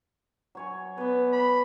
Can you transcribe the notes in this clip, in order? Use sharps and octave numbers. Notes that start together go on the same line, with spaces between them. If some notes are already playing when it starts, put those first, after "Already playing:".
F#3 C#5 G#5
B3 B4 D5
B5